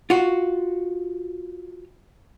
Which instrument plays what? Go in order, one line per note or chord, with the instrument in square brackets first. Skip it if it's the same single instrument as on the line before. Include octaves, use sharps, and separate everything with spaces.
[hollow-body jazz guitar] F4 F#4